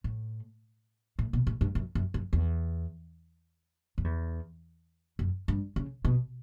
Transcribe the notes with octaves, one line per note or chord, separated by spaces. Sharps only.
A2
A2
B2
A2
G2
F#2
F#2
F#2
E2
F#2
E2
F#2
G2
C#3
B2